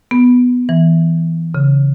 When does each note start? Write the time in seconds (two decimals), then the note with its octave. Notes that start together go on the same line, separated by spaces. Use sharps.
0.11 B3
0.69 E3
1.54 C#3